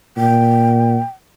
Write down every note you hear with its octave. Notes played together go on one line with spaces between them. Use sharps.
A#2 G5